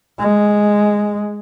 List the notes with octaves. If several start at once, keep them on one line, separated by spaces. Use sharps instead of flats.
G#3